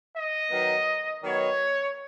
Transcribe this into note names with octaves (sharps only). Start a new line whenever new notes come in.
D#5
D#3 F#3 B3 D#4
D#3 F#3 B3 D#4 C#5